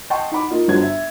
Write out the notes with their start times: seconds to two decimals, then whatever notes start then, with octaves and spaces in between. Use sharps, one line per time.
0.10 D#5 F#5 G5 A5 C6 C#6
0.31 D#4 F#5 B5 D6
0.51 A#3 D#4 F4 D#5
0.68 G1 D4 F#4 C5 G#6
0.82 E5